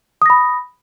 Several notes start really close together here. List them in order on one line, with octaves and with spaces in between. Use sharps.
D#6 A#6 B5